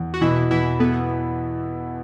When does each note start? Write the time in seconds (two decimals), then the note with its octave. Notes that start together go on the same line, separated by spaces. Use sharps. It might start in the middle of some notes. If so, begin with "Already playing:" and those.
Already playing: E2
0.14 F#4
0.21 B2 E3 E4
0.51 E2 E3 E4
0.79 B3 A4